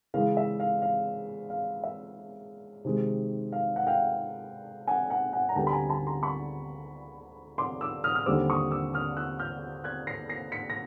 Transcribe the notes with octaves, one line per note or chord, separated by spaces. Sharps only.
C#3 E3 G#3 F5
E5
F5
F5
F5
E5
C3 D#3 G#3
F5
F#5
F5 G5
F#5 G#5
F#5 G#5
F#5 G#5
A#5
D2 D3 G3 B3 G5 A5
B5
G#5 A#5
A5 B5
A#5 C6
B5 C#6
C6 D6
D6 E6
D#6 F6
F6
D#2 D3 G3 C4 D6 E6
C#6 D#6
D6 E6
D#6 F6
E6 F#6
F6 G6
F#6 G#6
A#6 C7
A#6 C7
B6 C#7
A#6